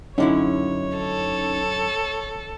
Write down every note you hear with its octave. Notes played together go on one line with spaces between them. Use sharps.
F#2 D3 C#4 D#4 E4 C#5
A4